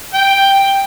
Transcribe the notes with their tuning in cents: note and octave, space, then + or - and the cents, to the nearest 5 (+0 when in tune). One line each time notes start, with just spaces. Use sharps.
G5 +5